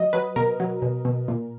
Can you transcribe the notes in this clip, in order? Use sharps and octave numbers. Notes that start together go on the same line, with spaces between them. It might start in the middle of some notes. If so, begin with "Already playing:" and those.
Already playing: F#3 D#5
F#3 B4
B2 A#4
F#3
B2
B2
A#2